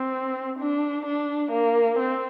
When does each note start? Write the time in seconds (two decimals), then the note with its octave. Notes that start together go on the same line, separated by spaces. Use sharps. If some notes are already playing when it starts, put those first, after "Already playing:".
Already playing: C4
0.59 D4
1.06 D4
1.52 A#3
1.99 C4